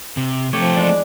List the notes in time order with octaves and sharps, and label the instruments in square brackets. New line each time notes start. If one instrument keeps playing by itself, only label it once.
[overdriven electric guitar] C3
[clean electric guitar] C3 G4 C#5 [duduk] F3 [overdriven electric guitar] A3 C4
[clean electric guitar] E2 G#3 D4 [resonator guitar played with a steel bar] D5